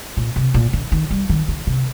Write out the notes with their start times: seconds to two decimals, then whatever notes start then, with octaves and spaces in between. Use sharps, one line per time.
0.17 A#2
0.36 C3
0.54 A#2
0.73 D3
0.92 D#3
1.11 G3
1.29 D#3
1.48 D3
1.67 C3